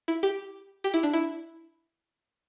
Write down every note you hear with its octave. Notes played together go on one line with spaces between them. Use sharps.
E4
G4
G4
E4
D4
E4